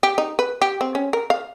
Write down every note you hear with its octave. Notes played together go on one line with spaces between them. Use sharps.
G4
D#4
B4
G4
C4
C#4
A#4
F5